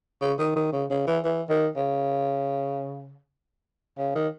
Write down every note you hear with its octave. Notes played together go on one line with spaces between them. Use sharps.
C#3
D#3
D#3
C#3
C#3
E3
E3
D#3
C#3
C#3
D#3